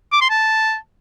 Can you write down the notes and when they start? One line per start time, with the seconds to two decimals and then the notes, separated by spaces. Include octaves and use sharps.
0.12 D6
0.21 C6
0.30 A5